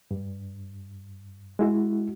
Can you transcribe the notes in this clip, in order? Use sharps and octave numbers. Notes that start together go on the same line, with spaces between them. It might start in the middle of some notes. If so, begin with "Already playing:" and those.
G2
G#3 E4 F#4